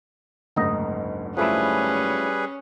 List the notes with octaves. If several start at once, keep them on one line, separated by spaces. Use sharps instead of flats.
F#1 D2 G#2 D#4 D#5
F3 G3 A3 C#4 E4 G#4 B4